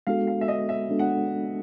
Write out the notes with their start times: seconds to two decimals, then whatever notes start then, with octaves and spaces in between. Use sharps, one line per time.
0.07 G#3 B3 D4 F#4 A4 F5
0.27 F5
0.41 E5
0.48 D#5
0.69 E5
0.90 G#3 B3 D4 F#4 A4
0.99 F#5